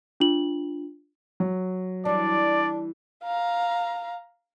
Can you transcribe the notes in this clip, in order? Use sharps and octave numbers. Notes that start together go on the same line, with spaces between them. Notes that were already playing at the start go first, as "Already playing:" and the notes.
D4 F4 F#7
F#3
E3 G3 D4 D5
F5 A#5